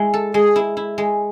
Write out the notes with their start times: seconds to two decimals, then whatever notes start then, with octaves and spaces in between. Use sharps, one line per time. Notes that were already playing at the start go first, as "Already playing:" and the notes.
Already playing: G#3 E4
0.14 A4
0.34 G#3 G#4
0.56 E4
0.77 E4
0.98 G#3